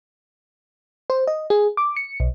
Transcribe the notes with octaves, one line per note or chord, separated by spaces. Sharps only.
C5
D#5
G#4
D6
C#7
B1